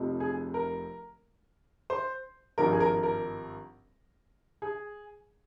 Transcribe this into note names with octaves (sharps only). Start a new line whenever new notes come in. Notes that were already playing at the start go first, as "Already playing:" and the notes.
Already playing: F1 F2 C3 F3
G#4
A#4
C5
G#1 G2 F3 A#4
G#4
A#4
A#4
G#4